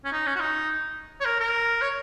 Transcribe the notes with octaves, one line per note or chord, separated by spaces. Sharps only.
C#4
D#4
C#4
F#4
D#4
C#5
A#4
A#4
C#5